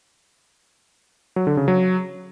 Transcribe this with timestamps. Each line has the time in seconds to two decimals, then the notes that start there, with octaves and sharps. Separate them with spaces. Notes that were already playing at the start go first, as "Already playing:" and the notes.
1.36 F#3
1.47 D3
1.57 C#3
1.68 F#3